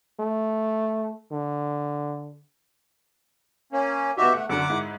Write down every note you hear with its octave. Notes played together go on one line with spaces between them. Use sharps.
A3
D3
A#3 C#4
B3 D#4 F#4 G4 E5
A3 F#5
F#2 D3 F#5 D6
G#2 E4